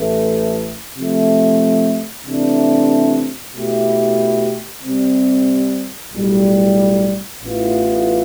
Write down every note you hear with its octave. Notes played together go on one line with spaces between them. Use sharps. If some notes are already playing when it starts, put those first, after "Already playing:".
Already playing: A1 A2 E3 A3
C3 F3 A3
C3 E3 A3 D4
B2 A3 E4 G4
C3 G3 C4
B1 A2 G3
A1 A2 E3 B3 F4